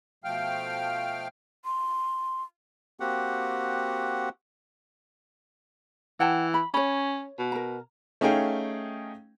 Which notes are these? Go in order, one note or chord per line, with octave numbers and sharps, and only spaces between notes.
B2 F3 A3 F5 G5 F6
C6
A#3 C4 F#4 G4 F#5
E3 F#5 G5 A5
B5
C#4 C#5 B5
B2
A#4 A#5
A3 C#4 D#4 G#4 F5 G5